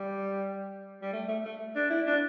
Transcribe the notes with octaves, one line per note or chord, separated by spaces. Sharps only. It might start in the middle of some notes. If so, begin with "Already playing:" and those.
Already playing: G3
G3
A3
A3
A3
D4
E4
D4